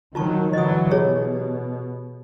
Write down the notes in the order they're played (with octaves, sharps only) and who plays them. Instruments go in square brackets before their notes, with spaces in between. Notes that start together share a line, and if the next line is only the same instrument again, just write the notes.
[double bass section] D#3 F#3 [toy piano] F4 A5 C#6
[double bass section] D3 E3 F#3 [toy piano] D#5 D#6
[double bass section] B2 [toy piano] G4 G#4 C#5